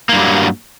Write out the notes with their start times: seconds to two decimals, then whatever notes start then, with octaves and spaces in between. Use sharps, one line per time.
0.09 A#3
0.13 G2
0.17 G3
0.20 F#3